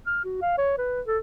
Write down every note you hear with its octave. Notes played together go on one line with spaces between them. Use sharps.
F6
F#4
F5
C#5
B4
A4